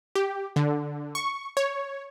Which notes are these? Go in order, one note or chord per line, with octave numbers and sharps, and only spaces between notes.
G4
D3
C#6
C#5